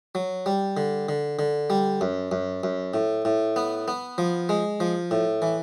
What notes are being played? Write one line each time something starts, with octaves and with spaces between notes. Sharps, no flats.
F#3
G3
D3
D3
D3
G3
F#2
F#2
F#2
A2
A2
B3
B3
F3
G#3
F3
A2
E3